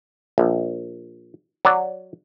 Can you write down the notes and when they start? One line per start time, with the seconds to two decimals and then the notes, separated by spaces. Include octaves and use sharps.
0.38 A#1
1.65 F#3 D5